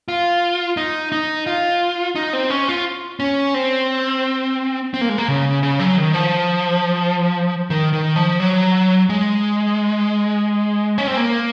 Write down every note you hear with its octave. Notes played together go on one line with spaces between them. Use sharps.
F4
D#4
D#4
F4
D#4
C4
C#4
F4
C#4
C4
C4
A#3
G#3
A#3
C#3
C#3
F#3
D#3
F3
D#3
D#3
F3
F#3
G#3
C#4
C4
A#3